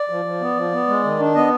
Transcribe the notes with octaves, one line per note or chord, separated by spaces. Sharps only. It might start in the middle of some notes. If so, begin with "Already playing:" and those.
Already playing: D5
F3
F3
B3
F3
B3
G#3
D#3
D4
B3 D#5